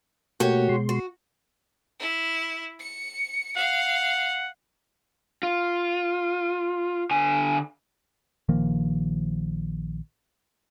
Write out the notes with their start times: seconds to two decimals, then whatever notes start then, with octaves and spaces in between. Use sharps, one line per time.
0.40 B2 A3 A#3 F#4 G4 C#5
0.69 B2 G#3 C6
0.89 F#4
1.99 E4
2.79 C#7
3.56 F5 F#5
5.43 F4
7.11 D3 G#5
8.49 A#1 D#3 F3 A#3